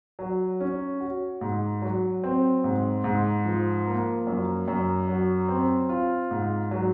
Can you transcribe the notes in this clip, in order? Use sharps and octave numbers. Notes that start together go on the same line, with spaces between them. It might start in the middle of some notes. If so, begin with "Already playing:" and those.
F#3
C#4
F#4
G#2
F#3
C4
G#2
G#2
F3
A#3
F#2
F#2
F#3
C4
F4
G#2
F#3